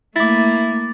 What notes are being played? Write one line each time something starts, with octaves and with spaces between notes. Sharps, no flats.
A3 A#3 E4 D6 A6